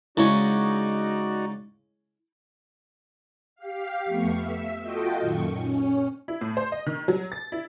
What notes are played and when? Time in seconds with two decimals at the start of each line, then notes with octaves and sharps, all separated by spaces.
0.17 C#3 G#3 D#4 E4 F#4 C#5 D5
3.56 G4 F5
4.05 F2 A3 B3 C#6
4.38 E5
4.82 F4 F#4 A4 D#5 G5
5.19 F#2 A#2 D#3 C#6
5.51 C#4
6.28 E4
6.41 A2
6.57 C5
6.72 D#5
6.86 D#3
7.08 F#3
7.32 A6
7.52 E4